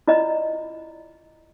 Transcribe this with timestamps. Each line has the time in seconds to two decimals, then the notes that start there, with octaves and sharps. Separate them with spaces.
0.08 E4 F4 D5 D#5 A#5